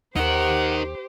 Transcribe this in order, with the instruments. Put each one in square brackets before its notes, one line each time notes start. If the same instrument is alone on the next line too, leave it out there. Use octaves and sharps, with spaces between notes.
[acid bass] D#2 [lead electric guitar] D#4 A#4 [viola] G4 C5 [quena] F#5